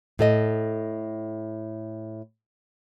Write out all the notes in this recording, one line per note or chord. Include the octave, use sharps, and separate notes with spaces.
A2 A4 D#5